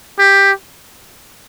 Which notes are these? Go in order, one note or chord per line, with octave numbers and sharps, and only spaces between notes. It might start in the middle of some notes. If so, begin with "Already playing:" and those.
G4